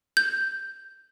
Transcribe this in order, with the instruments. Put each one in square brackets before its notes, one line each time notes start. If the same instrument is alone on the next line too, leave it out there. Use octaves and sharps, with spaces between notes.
[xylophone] G6